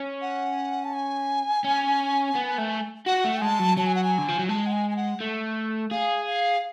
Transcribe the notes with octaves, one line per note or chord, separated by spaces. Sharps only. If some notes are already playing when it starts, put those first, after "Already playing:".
Already playing: C#4
F#5
A5
G#5
C#4
B3
A3
F#4 F#5
A3
G#3 A5
F#3
F#3 A5
G#5
F#5
G#5
D3
F3
F#3
G#3 A5
F#5
G#5
G#5
F#5
A3
G#4 F5
F5